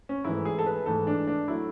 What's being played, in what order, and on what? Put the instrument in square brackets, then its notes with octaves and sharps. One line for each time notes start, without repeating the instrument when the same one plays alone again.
[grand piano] C#4
G#2 E3 A3 E4
G#4
A4
B4
G#2 E3 A3 A4
D4
D4
F#3 A3 E4